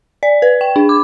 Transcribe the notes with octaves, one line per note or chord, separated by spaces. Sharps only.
D5
B4
G5
D4
D6